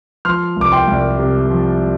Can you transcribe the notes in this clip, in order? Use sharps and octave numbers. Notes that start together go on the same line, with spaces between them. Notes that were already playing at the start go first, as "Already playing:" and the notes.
F3 C6 F6
C2 D6
G5 C6
C2
C3
F3